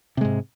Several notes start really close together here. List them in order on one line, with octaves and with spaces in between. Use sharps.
C3 G#3 G#2